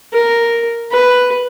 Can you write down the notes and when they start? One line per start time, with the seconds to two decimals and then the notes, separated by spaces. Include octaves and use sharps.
0.13 A#4
0.91 B4